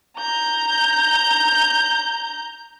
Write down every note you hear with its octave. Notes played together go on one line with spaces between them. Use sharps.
A#5 G6